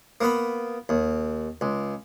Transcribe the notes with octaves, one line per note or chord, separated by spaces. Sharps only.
A#3 B3 B5
D#2
C#2